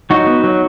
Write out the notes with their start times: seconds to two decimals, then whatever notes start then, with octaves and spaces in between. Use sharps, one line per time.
0.10 F#3 D#4 F#4
0.27 B3
0.44 F#3